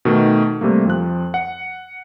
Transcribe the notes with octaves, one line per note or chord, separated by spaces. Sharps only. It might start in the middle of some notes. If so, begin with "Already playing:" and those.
B2 D#3 A3
C3 G3 A3 A#3
F2 F3 F#6
F#5